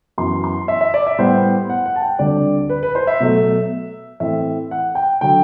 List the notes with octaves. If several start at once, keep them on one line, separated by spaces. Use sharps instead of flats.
F#2 E3 B3 C6
C6
E5
E5
D5
E5
A2 G3 B3 C5
F#5
F#5
A5
G5
D2 D3 G3 C4 D5
B4
B4
C5
E5
B2 F#3 A3
A2 E3 A3 C4 E5
F#5
G5
D3 F#3 G5